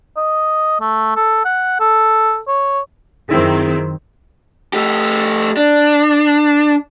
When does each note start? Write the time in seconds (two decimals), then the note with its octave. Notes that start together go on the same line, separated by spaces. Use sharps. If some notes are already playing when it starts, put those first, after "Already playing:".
0.17 D#5
0.81 A3
1.16 A4
1.45 F#5
1.80 A4
2.48 C#5
3.29 F#2 D#3 C4 E4 G#4
4.73 A3 G4
5.57 D4